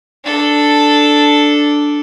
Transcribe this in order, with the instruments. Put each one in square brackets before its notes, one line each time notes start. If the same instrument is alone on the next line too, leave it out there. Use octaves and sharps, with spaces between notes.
[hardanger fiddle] D4 A4